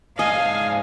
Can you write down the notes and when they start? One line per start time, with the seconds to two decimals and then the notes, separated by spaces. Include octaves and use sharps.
0.19 G#2 D4 G#4 D#5 F5 G#5